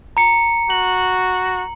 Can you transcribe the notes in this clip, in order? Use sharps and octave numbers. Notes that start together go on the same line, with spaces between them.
A#5 C#7
F#4 F#7